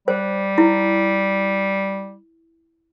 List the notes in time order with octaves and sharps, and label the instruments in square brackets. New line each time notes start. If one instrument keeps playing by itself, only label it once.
[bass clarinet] G3 [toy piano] C5
[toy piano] E4